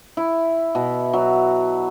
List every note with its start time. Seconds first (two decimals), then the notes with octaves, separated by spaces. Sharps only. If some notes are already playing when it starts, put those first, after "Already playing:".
0.17 E4
0.75 B2
1.13 F#3